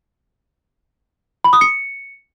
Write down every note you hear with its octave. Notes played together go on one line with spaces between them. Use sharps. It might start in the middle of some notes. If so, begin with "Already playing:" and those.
B5
D#6
C#7